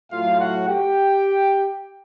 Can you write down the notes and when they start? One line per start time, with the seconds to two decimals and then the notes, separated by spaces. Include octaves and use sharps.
0.11 A2 F#3 A3 F4 F5
0.39 F#4 F#5
0.67 G4 G5